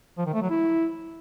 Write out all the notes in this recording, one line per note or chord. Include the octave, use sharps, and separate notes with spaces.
F3
D#3
A3
F#3
E4